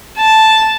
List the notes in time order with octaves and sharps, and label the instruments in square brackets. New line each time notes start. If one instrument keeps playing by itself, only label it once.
[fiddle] A5